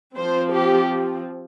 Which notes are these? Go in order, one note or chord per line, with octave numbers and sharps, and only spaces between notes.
F3 C4 C5
G4